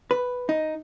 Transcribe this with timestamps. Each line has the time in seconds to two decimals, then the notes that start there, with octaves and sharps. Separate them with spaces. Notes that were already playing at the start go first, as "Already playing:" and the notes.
0.11 B4
0.49 D#4